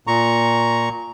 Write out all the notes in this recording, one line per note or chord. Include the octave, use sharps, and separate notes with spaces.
A#2 A#5 C#6